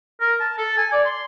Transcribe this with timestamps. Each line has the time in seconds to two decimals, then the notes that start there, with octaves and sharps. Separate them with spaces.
0.21 A#4
0.40 A5
0.58 A4
0.77 G#5
0.92 D5
1.05 C6